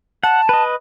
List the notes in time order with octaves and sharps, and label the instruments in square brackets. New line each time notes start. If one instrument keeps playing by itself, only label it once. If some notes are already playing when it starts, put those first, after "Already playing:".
[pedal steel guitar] F#5 [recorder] A5
[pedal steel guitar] B4 D#5